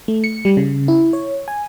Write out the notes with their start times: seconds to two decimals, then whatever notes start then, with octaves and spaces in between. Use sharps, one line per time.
0.08 A3
0.24 C#7
0.45 G3
0.57 C#3
0.88 E4
1.13 C#5
1.48 G#5